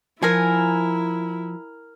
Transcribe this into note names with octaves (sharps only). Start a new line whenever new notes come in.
F3 E4 A#4 G#5